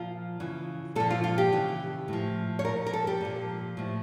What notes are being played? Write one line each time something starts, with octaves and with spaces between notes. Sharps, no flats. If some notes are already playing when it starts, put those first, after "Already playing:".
Already playing: A#2 F3 F4
C#3 E3
A#2 F3 A4
F4
F4
G4
C#3 E3
A2 F3
C#5
A#2 F3 A#4
A#4
A4
G4
A#2 F3
A2 F3